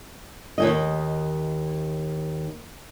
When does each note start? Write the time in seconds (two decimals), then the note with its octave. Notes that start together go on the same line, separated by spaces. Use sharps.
0.58 D#2 G#2 D#5